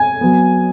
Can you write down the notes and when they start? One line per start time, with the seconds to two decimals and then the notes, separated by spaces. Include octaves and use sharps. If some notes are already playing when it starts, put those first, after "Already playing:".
Already playing: G#5
0.21 F#3 B3